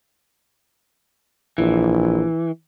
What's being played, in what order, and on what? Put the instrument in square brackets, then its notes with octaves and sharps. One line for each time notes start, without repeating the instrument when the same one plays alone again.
[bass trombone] A#1 [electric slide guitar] E3